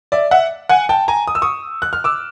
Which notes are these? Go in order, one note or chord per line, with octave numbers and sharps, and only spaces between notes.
D5 E5
E5 F#5
F#5 G#5
G5 A5
G#5 A#5
D#6
E6
C#6 D#6
F#6
F6
D6 E6